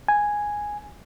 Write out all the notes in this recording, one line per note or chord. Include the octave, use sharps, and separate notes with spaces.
G#5